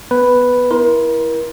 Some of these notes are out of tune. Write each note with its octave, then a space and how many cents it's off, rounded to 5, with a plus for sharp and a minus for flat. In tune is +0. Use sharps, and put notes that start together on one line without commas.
B3 +0 B4 +0
E4 +0 A#4 +35 C6 +0